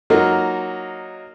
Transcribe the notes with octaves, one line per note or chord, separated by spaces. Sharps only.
F#3 A#3 D#4 F4 A#4